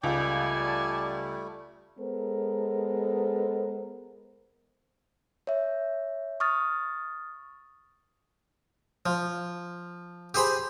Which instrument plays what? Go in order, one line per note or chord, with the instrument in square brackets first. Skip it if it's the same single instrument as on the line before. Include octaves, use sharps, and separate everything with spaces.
[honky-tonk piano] C#2 [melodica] G3 A3 [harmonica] D5 G#5 A5
[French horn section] G#3 B3 A4 A#4 C5
[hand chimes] C#5 E5
C#6 D#6 F6 A6
[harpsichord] F3
G4 G#4 C5 B5